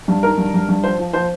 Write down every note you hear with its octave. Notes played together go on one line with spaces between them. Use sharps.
G2
D#3 A#4
G2
G2
G2
F3 C5
F3
F3 C5